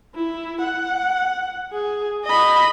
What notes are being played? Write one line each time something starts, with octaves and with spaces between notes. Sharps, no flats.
E4
F#5
G#4
D#5 B5